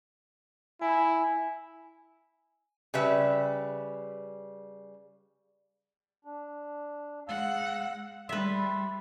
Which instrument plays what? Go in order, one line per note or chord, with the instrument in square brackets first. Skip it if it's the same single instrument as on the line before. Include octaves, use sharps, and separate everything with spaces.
[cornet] E4 [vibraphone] G#5
[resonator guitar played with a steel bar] C#3 G3 B4 E5
[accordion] D4
[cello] G#3 F#5 [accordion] F5 E6
[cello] G3 [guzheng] B4 E5 [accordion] C6